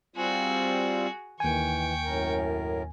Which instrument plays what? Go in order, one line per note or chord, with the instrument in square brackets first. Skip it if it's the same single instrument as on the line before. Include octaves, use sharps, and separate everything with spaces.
[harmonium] G3 C4 F4 [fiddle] F#4 G#4
[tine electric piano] D#2 G#5 [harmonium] D#3 E3 [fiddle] G5 C#6
[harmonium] F#2 A2 A#4